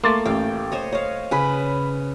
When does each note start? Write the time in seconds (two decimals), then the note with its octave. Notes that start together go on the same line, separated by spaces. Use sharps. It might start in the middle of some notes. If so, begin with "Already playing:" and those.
0.04 A3 A#3 C6 D6 A6
0.25 A1 F5 G5
0.72 C5 C#5 D#5
0.92 C#5 D#5 F5
1.31 C#3 B4 G#5 B5